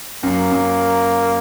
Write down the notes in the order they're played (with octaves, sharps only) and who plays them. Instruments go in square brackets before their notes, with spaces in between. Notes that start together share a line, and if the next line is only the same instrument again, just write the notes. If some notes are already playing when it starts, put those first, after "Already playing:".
[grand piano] F#2 [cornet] A#3
[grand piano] F#2